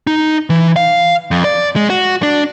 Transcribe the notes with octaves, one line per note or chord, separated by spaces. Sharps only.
D#4
E3
F5
F2
D5
G#3
F#4
D4